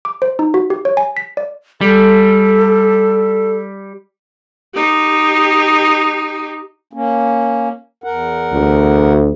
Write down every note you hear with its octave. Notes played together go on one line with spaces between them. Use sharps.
D6
C5
D#4
F#4
G4
C#5
G#5
B6
D5
G3 A4
D#4 G4
A#3 C#4
E2 A#4 F#5
D2